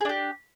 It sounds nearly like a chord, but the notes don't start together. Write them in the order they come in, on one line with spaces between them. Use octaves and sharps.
G#4 D4 G4